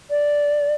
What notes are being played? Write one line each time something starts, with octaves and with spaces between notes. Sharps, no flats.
D5